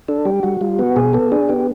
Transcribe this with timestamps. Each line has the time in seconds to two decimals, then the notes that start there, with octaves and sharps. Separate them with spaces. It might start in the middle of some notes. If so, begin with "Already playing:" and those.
0.08 D4 A4
0.25 G3 G4
0.43 G3 F#4
0.61 G3 F4
0.79 B3 F#4
0.96 B2 G#4
1.13 B3 A4
1.32 D4 G#4
1.49 B3 G4